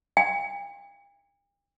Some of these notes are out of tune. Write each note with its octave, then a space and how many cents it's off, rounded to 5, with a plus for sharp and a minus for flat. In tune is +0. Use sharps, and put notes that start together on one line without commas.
G5 +45